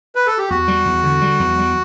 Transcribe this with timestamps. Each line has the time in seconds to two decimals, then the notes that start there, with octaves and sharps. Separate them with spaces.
0.15 B4
0.26 A4
0.38 G4
0.50 E2 F#4
0.68 G3
0.86 E2
1.03 D3
1.22 G3
1.40 E2
1.58 G3